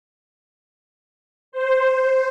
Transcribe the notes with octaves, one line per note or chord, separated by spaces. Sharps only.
C5